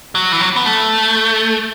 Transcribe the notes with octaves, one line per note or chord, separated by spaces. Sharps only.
F#3
E3
F#3
B3
A3